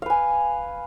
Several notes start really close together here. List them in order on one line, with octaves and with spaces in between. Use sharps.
F5 B4 G#5